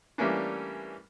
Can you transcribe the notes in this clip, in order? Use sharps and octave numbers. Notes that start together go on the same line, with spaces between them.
E3 G3 A3 A#3 C#4 D4